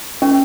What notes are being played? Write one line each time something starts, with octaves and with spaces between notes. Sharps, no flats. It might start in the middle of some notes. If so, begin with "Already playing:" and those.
C#4